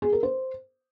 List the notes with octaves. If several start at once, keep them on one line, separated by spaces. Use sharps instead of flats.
G#4
A#4
C5